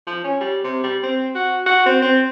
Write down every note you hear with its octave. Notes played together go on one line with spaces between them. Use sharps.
F3
C#4
G3
C3
G3
C4
F#4
F#4
C4
C4